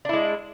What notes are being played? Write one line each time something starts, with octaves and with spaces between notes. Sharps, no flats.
G#3 D4 E4